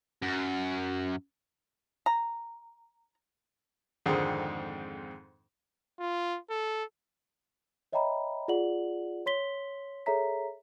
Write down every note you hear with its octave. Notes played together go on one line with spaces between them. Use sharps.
F#2
A#5
F2 G#2 D3 D#3 G#3 C4
F4
A4
C#5 D#5 E5 G5 A#5 B5
F4 G#4 D5 F#5 F#7
C#5 C6 B6 G7
G#4 A4 C#5 E5 A#5 B6